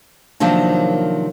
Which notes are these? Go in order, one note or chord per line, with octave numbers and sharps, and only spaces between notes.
C3 D#3 F3 F#3 A#3 D4